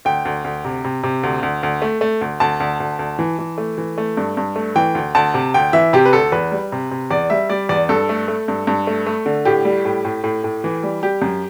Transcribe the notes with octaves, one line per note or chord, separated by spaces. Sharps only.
D2 G5
D2
D2
C3
C3
C3
D2
D2
D2
A3
A3
D2
D2 A5
D2
D2
D2
E3
E3
A3
E3
A3
G2
G2
A3
E3 G5
D2
D2 A5
C3
D2 G5
E3 E5
C3 G4
B4
D2 A4
E2 B4
G3
C3
C3
E2 D5
G3 E5
G3 D5
E2 D5
G2 A4
A3
A3
G2
G2
A3
A3
D3
A2 G4
G3
A2
A2
A2
A2
E3
G3
G3 G4
F#2